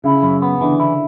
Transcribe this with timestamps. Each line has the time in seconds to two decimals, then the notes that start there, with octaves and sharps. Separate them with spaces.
0.04 C#3 E4
0.23 F#2
0.42 B3
0.61 D3 E3
0.80 E4